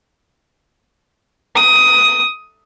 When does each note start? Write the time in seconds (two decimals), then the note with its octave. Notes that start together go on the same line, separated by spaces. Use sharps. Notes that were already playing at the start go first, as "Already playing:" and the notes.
1.56 D#6